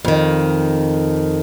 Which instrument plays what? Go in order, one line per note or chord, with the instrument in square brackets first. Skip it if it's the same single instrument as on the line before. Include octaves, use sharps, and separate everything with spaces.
[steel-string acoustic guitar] F2 D#3